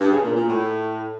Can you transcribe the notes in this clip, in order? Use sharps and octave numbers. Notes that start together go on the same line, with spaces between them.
G2
C#3
A#2
A#2
A2